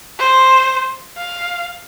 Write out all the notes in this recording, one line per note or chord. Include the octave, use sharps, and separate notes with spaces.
C5
F5